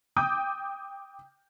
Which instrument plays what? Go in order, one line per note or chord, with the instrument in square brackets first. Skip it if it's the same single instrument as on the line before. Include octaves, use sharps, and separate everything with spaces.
[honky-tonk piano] G5 D6 D#6 G6